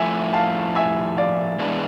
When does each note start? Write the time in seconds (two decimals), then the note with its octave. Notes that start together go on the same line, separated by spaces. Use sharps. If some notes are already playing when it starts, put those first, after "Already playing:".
Already playing: A2 F3 A3 E4 E5 G#5
0.33 F5 A5
0.75 E5 G#5
1.17 D5 F5
1.59 E3 G#3 B3 D4